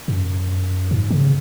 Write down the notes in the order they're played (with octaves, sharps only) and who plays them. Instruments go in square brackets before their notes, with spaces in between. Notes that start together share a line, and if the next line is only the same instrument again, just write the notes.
[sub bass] F#2
G#2
C#3